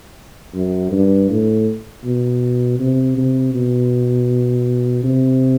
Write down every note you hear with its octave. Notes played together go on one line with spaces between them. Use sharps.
F#2
G2
A2
B2
C3
C3
B2
C3